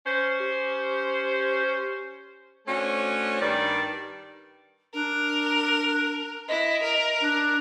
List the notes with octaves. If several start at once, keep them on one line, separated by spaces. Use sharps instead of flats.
C#4 C5
G4
A3 C#4 D4 F#4 C5 C#5
G2 D#3 G3 D5
D4 A#4
E4 D#5
A#4
D4